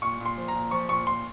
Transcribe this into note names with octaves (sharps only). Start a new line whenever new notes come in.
A#2 C#6
A#2
C6
F3
A#5
A#2
F3 C#6
A#2 C#6
A#2 C6